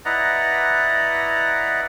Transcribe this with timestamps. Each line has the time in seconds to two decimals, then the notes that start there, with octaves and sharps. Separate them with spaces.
0.05 E4 B4 D5 D#5 F#5 A#5